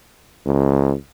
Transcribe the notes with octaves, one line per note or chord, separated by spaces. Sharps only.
C#2